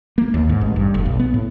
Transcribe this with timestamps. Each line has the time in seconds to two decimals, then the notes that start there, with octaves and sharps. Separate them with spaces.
0.18 A#3
0.34 D#2
0.49 G#2
0.61 A1
0.76 G2
0.94 F1
1.06 B1
1.20 B3
1.34 A2